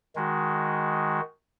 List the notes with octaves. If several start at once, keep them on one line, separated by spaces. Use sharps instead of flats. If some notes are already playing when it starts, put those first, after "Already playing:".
D#3 G#3 F#4